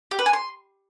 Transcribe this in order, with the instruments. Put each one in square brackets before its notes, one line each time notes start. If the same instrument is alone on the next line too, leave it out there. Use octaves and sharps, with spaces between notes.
[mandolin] G4
B4
G#5
C6